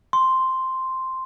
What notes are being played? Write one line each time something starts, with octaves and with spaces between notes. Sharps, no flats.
C6